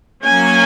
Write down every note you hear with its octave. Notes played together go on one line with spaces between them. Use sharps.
F#3 A#3 C#4 G#5